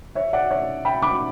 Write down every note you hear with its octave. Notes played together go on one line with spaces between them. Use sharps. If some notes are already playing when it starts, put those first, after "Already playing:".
C#5 E5
D5 F#5
C#5 E5
G5 B5
B5 D6